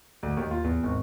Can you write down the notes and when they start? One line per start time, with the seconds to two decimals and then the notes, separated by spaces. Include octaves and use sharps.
0.23 D2
0.37 D#2
0.51 F4
0.64 E2
0.83 G#1